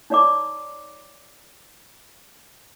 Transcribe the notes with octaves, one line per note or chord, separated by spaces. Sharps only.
D#4 C#5 D5 A#5 D6